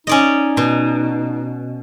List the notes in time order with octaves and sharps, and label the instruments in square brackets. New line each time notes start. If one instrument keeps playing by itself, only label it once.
[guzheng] C#4 D5 D#5 [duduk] D#4
[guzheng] B2